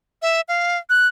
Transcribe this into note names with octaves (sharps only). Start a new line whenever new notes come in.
E5
F5
F#6